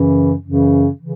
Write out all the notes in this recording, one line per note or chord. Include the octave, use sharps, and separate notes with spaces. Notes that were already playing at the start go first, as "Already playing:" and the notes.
Already playing: F#2 C#3 E3 C#4
F#2 C#3 E3 C#4
C#3 E3